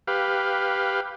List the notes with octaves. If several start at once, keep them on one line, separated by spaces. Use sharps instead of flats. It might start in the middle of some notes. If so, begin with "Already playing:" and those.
G4 B4 F5